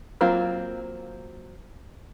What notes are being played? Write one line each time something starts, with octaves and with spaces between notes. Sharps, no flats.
F#3 A#3 C4 F4